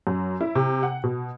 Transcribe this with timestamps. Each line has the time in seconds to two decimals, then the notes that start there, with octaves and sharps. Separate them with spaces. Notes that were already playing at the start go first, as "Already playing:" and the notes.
0.07 F#2
0.41 E4
0.55 C3
0.83 F#5
1.04 B2